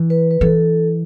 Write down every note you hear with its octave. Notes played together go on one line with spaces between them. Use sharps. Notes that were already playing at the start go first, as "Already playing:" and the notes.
Already playing: E3
B4
B4
E3 A4